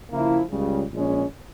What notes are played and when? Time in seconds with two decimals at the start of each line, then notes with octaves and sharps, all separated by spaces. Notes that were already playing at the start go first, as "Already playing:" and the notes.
0.11 C#3 F3 A#3 E4
0.51 C#2 C#3 G3
0.91 A#1 A#2 G#3 C#4